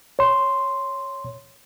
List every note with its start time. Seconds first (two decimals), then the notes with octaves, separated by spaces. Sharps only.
0.19 C#5 C6